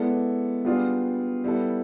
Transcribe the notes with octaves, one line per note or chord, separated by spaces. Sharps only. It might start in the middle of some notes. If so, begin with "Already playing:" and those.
Already playing: G#3 B3 E4 A4 D5
G3 B3 D4 F4 G#4
G3 B3 E4 A4